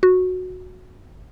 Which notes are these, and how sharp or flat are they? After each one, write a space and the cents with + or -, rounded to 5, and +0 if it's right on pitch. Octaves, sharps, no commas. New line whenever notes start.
F#4 -10